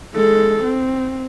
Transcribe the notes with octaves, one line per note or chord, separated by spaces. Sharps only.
G#3 A4
C4